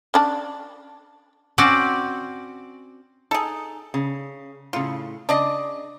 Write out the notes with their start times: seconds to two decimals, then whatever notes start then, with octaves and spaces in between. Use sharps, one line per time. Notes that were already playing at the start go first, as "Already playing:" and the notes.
0.14 C#4 D4 A5
1.58 C4 C#4 F#4 D5 F#5
3.31 D#4 G#4 A4
3.94 C#3
4.73 A2 C#3 F4
5.29 C#3 D4 D5 D#5